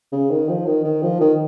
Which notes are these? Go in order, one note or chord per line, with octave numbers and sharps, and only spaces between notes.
C#3
D#3
F3
D#3
D#3
F3
D#3